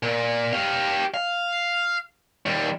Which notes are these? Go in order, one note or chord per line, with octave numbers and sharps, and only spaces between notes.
A#2
G4 F5
F5
D#2 G3